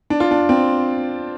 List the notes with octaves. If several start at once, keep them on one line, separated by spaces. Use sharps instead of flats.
D4
F4
D4
C4